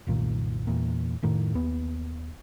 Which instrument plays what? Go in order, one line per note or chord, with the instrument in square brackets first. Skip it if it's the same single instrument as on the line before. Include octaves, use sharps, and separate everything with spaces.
[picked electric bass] F#1 C2 A#2 D#3
E2 A#2
F1 A2 D#3
D#2 B3